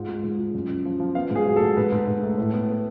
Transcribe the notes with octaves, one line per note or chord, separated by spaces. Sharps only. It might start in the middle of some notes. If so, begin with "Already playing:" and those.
Already playing: G#2 F4
G#3
G#2
F4
F#2
F#2
F3
F3
B3 F5
G#2 G#4
F#3
G#2 A4
G#2 B4
G#2
G#2
A3
A2
B3
B3